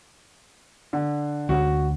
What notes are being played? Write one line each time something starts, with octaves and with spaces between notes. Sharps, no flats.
D3
D2 B3 C#4 F#4